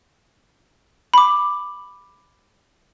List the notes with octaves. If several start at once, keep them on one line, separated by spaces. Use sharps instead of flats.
B5 D6